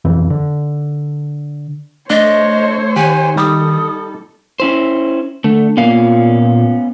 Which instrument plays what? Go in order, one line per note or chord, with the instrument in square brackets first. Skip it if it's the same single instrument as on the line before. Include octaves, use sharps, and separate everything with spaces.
[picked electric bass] B1 F2 E3
D3
[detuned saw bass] A3 [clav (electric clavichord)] D4 [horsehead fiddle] C5 C#5 [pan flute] D#5
[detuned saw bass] D#3 [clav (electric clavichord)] G4 F#5 [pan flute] G#5
[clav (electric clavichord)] G3 [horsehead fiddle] D#4 A4 [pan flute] D#6
[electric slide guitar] C#4 E4 C5
[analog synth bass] D3 [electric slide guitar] A3
[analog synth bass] A#2 [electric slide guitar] B3 C#4 F5